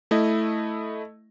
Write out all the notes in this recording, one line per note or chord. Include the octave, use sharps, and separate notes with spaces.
A3 E4 D#5